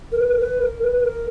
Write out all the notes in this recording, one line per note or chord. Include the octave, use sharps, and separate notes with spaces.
A#4
B4
A#4
B4
A#4
B4
B4
A#4